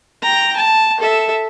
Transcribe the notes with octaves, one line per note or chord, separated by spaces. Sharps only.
G5 A#5
A5
A4 E5